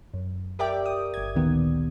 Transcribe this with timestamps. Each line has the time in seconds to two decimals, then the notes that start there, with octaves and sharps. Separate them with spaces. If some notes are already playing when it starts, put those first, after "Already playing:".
0.14 F#2
0.59 G4 A#4 D5 E5 G5 D6
0.86 D#6
1.14 G1 G#6
1.35 D2 A#2 D#3 B3